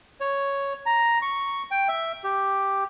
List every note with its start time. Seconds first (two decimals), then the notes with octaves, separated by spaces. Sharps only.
0.21 C#5
0.86 A#5
1.22 C#6
1.71 G5
1.88 E5
2.24 G4